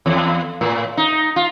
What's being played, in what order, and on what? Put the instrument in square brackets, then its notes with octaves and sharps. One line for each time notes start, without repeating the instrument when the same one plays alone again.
[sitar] E2
A2
D#4
F4